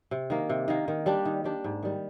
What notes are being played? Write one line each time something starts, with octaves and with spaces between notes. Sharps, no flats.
C3
D#3 A#3
C3
D#3 A#3
D#3
G3 D4 G4
D#3
G3 D4 G4
G#2
D#3 G3